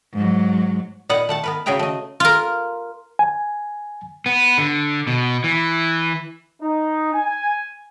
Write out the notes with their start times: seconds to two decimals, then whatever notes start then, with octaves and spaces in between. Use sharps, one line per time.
0.13 G#2 F#3
1.09 A#2 B3 D#4 F#5
1.29 A3 F#5 A5
1.44 B3 A#4 B4
1.66 C#3 F#4 G#4 E5 G5 A#5
1.79 A3 D#5
2.20 F4 A#4
3.19 G#5
4.26 B3
4.58 D3
5.07 B2
5.44 E3
6.62 D#4
7.13 G#5